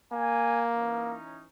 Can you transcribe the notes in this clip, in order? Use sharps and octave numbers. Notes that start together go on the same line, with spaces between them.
A#3 G#5
E3 C#4 D#4